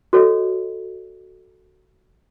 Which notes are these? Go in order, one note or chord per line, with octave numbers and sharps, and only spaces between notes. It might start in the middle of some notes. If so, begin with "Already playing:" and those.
F#4 A4 C#5 D#5